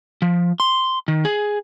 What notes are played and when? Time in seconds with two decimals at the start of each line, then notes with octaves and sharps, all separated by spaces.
0.22 F3
0.60 C6
1.08 D#3
1.25 G#4